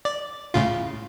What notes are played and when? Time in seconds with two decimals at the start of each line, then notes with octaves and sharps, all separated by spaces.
0.05 D5
0.54 A2 C#3 F4